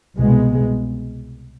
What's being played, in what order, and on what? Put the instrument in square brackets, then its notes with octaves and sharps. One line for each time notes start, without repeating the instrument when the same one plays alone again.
[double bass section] C2 B2 G#3 B3